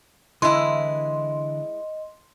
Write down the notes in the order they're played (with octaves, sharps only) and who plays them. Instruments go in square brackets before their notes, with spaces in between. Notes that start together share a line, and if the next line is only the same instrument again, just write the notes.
[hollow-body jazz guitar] D3 E3 [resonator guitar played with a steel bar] G#3 E4 [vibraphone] D#5 [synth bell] C6